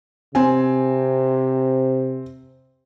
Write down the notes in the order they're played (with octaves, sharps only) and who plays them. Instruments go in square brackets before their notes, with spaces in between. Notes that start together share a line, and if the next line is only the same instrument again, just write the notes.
[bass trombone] C3 [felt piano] C4 G#5